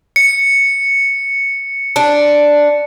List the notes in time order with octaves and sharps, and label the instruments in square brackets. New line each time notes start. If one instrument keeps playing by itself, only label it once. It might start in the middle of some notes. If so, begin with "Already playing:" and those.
[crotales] C#7
[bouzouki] D4